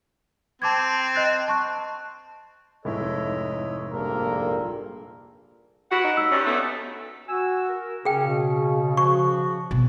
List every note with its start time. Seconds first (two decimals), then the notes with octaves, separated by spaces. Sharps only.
0.62 C4 A5 D6 G#6
1.15 D#5 F#6 A6
1.48 A5 C#6 F#6
2.85 F1 G#2 E4 A4 C#5 D#5
3.92 A#1 G2 A#2 A#3 A4 A#4
5.91 E4 F#4 B4 F#5
6.04 D#4
6.17 E6
6.31 G2 C#4
6.46 D2 A3 B3
7.27 F#4 G#5 E6
7.66 A#4
8.05 C#3 C#4 G#4 G5
8.27 B2
8.97 F3 F#4 C#6
9.71 B2